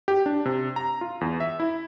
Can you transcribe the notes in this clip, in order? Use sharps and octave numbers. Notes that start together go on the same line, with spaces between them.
G4
D4
C3
A#5
F4
E2
E5
E4